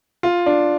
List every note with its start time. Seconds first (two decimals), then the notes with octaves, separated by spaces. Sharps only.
0.23 F4
0.46 D4